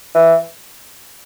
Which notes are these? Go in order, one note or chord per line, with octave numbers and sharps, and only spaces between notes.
E3